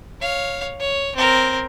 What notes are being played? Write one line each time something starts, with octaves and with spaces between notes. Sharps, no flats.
C#5 F5
C#5
C4 A#4